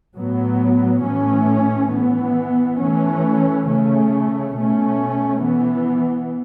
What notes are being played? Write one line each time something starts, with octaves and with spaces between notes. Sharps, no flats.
A2 F#3 B3
A2 E3 A3 C#4
E3 B3
E3 A3 C#4
C#3 A3 C#4
B2 A3 C#4
E3 B3